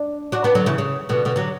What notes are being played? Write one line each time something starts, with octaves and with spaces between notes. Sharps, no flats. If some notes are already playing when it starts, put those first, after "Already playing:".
Already playing: D4
D4 F#4
B3 D4
D3 F#3
C#3 E3
C#3
B2 D3
B2 D3
D3 F#3